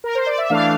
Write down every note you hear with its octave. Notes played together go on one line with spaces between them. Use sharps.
A#4
C5
D5
E5
E3 A3 D4 F5